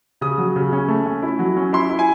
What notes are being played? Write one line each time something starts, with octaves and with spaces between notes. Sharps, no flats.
C#3 D#6
F#3
C#3
C#4
A3
C#4
E4
F#3
C#4
E4 C6
E4
G#5